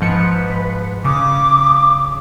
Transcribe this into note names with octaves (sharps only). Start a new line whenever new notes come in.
G#2 F3 B4 C#7
C#3 D6 D#6